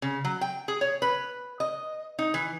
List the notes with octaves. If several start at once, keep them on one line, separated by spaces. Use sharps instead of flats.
C#3
F#3
G5
G#4
C#5
B4
D#5
D#4
E3